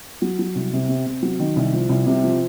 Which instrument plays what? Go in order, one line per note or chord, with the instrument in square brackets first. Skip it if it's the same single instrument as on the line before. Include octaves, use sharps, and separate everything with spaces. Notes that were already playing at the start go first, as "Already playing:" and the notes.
[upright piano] F#3
F#3
C2
C3
C3
C3
F#3
D#3
C2
F3
C2
C3
F3